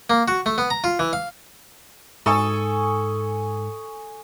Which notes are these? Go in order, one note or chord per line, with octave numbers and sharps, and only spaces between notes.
A#3
F#4
A3
B3
A#5
F4
E3
F5
G#2 A4 G#5 C#6 D#6